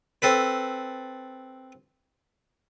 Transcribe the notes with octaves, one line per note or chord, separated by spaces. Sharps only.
C4 A4 B4